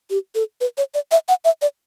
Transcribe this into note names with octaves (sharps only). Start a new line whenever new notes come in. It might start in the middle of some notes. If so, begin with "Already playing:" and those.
G4
A4
B4
C#5
D5
E5
F#5
E5
D5